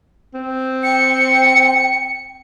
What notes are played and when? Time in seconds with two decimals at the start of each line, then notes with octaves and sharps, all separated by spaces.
0.34 C4
0.83 G5 C#7